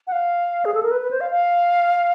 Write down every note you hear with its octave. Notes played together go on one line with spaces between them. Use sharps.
F#5
F5
G#4
A4
A#4
B4
B4
C5
F5
F5